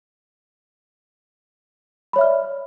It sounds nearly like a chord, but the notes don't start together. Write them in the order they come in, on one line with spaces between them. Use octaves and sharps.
B5 C#5 E5 F6 D5